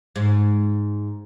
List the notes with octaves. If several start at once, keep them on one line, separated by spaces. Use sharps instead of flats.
G#2